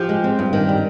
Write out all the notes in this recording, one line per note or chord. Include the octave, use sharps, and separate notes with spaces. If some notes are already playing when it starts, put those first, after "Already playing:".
Already playing: F3 G4
G#3
C4
G2
D#3
G3